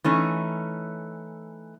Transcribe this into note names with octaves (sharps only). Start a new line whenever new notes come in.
E3 A3 C#4 D#4